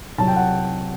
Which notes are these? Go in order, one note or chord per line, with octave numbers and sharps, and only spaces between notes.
C2 C3 F#3 A5
G5
F#5